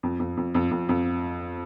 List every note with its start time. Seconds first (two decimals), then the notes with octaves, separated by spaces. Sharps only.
0.03 F2
0.19 F2
0.37 F2
0.55 F2
0.71 F2
0.89 F2